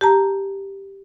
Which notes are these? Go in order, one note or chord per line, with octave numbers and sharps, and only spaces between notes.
G4 A5 A#5